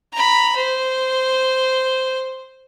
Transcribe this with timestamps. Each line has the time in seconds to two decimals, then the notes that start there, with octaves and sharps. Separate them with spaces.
0.13 A#5 B5
0.56 C5